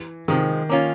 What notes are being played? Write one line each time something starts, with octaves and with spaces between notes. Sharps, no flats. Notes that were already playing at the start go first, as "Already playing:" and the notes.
Already playing: E3
C3 D#3 F3 G#3
A#3 C#4 F4